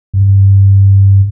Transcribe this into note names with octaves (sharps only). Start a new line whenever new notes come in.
G2